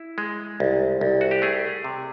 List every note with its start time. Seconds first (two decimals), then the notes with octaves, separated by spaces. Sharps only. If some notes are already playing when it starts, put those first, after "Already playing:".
Already playing: E4
0.18 G#3
0.60 C2
1.01 C2
1.21 F#4
1.31 G4
1.42 A3 G#4
1.84 C3